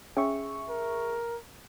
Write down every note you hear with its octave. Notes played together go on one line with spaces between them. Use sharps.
C#4 G#4 C#5 E5 G5 C#6
A#4